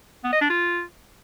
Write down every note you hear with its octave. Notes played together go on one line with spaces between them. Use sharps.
B3
D#5
D4
F4